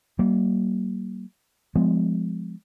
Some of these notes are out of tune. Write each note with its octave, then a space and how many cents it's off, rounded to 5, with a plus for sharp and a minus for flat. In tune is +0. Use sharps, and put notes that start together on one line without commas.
G3 -45 A#3 +0
F3 +0 G#3 +0 B3 +45